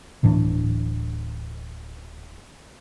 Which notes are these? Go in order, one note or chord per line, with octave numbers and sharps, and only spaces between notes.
D1 A2 E3 D4